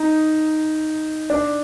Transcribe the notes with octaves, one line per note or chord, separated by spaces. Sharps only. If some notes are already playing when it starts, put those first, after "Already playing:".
Already playing: D#4
D4